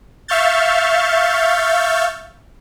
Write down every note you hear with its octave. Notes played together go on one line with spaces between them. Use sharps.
E5 F5 C#6 F6 G6 A6